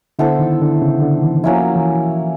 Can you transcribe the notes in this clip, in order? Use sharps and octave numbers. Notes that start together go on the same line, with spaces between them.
D3 B3 E4 A4 C5
D#3
D3
C#3
D3
D#3
E3
F3 F#3 A#3 C#4 E4
E3